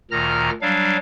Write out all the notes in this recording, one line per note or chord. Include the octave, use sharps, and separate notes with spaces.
D2 A#2 D#3 A#5 F6 A#6
F#3 G3 D4 F5